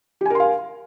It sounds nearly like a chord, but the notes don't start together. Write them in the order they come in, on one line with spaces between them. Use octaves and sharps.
G4 G#5 A#4 C6 F5